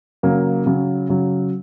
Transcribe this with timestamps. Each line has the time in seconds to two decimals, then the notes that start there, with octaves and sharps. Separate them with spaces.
0.23 C#3 F#3 A#3
0.66 C#3 F#3
1.09 C#3 F#3